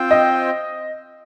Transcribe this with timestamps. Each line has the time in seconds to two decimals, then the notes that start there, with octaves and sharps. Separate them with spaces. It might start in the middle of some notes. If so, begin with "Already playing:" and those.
Already playing: C4 F4 C5 G5
0.11 D#5